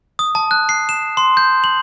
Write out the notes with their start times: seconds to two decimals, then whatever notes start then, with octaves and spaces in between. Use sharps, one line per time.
0.19 D#6
0.35 A5
0.51 F#6
0.69 C7
0.89 E7
1.17 C6
1.37 G6
1.64 F#7